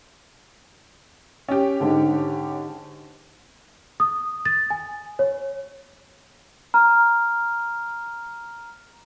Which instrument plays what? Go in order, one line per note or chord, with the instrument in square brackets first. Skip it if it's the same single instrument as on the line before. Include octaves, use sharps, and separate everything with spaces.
[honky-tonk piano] C#4 G4
[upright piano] G#2 D3
[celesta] D#6
A6
G#5
C#5
A#5 F6